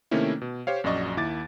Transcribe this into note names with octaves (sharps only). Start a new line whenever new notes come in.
C3 D#3 A3 A#3 C#4 E4
B2
G4 C5 C#5 F5
A#1 F#2 F#4 D5 D#5 C#6
D#2 E4 D6 A6